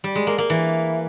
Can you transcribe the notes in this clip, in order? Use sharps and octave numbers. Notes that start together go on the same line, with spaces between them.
G3
G#3
A#3
A#3
E3